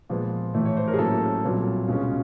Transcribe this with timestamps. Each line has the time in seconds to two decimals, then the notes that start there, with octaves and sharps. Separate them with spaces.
0.10 A#2 F3 G#3 B3
0.54 A2 E3 A3
0.65 C#5
0.77 C5
0.88 A#4
0.94 G#4
0.99 A2 F#3 A#3 C#4 A4
1.44 C2 A#2 F#3 B3
1.88 C#2 B2 G#3 C#4 F4